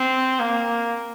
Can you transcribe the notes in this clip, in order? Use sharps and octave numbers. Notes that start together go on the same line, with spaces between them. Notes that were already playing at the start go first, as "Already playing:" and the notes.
Already playing: C4
A#3